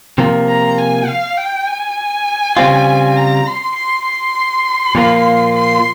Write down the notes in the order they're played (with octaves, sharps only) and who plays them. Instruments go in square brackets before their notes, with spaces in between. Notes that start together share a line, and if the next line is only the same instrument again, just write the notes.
[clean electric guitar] C3 F3 A#3
[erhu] A#5
G#5
F5
G5
G#5
[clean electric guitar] C#3 G3 C4 F4
[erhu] A#5
C6
C6
C6
[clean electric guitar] A#2 F3 A#3 F4
[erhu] C6